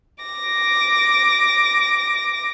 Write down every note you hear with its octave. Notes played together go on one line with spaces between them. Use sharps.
D6 A#6